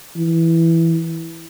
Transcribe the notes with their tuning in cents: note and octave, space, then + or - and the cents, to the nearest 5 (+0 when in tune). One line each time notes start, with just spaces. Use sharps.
E3 +0